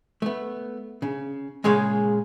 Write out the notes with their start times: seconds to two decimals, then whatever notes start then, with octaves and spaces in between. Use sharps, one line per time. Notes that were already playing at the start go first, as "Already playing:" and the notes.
0.22 A3 B3
1.02 C#3
1.64 A#2 C#3 G#3 G#4 C#5 F5